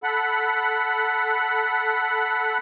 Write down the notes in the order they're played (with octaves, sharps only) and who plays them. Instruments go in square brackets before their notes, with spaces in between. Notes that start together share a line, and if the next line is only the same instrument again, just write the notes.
[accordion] A4 F#5 B5